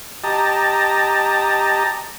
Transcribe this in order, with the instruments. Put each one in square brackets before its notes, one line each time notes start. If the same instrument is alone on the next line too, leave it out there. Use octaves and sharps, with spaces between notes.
[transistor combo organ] G4 D#5 A5 A#5